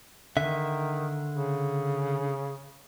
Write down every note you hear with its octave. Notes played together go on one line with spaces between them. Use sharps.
D3 D#3 E5
C#3